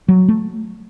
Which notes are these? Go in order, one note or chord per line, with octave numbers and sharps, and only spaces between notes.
F#3
A3